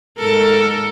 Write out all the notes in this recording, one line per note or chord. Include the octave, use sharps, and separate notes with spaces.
G#2 A4 A#4